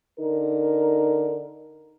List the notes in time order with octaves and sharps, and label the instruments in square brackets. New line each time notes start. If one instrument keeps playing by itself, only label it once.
[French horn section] D3 D#4 A#4